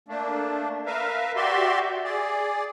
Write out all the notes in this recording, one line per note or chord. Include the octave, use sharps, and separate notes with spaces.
A3 A#3 D4
A#4 B4 E5 F5
F#4 G4 D5 E5 C6
G#4 D5